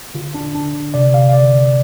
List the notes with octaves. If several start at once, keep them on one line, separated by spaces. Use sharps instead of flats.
D3 F4
D3 D4
D3 D4
D3
C3 D5
C3 F5
F5
D3 D5
D3